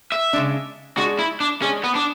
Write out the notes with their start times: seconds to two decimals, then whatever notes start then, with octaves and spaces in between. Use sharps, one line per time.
0.12 E5
0.33 C#3 G#3 D4
0.97 G#3 D4 F#4 G#4
1.19 E4
1.40 D4
1.62 G#3 C#4 D4 G#4
1.84 B3
1.95 D4